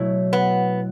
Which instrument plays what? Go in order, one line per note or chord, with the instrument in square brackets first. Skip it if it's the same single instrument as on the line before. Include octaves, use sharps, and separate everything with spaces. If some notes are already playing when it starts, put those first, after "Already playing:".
Already playing: [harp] B2 F#3 A3 E4
[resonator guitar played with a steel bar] B3